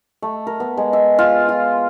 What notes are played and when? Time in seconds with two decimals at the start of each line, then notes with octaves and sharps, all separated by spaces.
0.22 A3
0.47 A#4
0.60 B3
0.77 G#3
0.93 E5
1.19 F4
1.49 F4